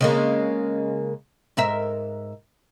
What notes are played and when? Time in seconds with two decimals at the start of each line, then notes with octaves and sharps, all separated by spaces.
0.01 C#3 G#3 A#3
1.57 G#2 A#4 E5